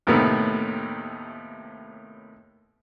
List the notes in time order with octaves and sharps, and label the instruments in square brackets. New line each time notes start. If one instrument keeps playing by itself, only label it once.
[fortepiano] D#2 A2 C3 D#3 A3 B3